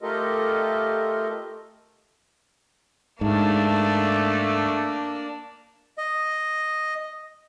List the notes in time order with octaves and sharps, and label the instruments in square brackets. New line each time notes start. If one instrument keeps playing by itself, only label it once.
[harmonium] A3 F4 G4 A4 A#4 D#5
[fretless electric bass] G#2 [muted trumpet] A3 [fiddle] A#3 D4
[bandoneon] D#5